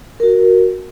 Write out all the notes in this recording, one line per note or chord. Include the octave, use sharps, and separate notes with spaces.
F#4 A#4